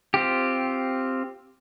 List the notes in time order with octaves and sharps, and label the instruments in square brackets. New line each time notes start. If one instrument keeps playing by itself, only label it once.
[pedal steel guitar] C4 F4 G4